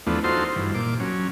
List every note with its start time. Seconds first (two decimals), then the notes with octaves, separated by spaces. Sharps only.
0.07 E2 F3 A3 B3 D4
0.24 D#4 F4 F#4 A4 C5 C6
0.56 G2 E3
0.75 A#2 D6
1.00 F#3 C#4